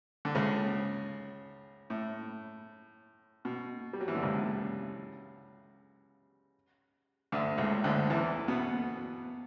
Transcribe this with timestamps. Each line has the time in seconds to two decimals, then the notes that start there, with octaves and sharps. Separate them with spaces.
0.25 D3
0.35 C#2 C#3
1.90 A2
3.45 B2
3.93 G3
4.01 F#3
4.08 E3
4.15 D3
4.22 C#2 C#3
7.32 D2 D3
7.58 C#2 C#3
7.84 D2 D3
8.10 E2 E3
8.48 B2 B3